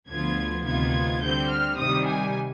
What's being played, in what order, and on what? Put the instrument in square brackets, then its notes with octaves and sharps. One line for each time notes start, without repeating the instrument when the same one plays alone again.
[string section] D2 D3 F3 B3 F4 G#6
D2 C3 D#3 B3 F4 G#6
D3 G3 C4 G6
F6
C3 D#3 G3 D#6
G#5